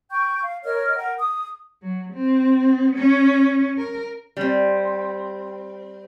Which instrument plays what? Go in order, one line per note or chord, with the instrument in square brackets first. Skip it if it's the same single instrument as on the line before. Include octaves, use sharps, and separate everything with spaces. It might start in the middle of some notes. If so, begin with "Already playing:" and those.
[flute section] G5 C#6 G6
F5
A#4 C#5 D#5 F6
A#4 F#5 G5
D#6
[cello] F#3
C4
C#4
A#4
[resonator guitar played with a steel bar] G3 C4